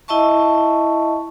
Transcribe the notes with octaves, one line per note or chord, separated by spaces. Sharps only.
E4 D#5 E5 A5 C#6